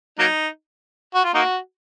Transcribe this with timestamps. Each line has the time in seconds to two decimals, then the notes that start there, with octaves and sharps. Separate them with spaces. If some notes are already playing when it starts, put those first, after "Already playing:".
0.19 F#3 A#3 D#4
1.15 F#4
1.25 F4
1.34 A#3 D#4 F#4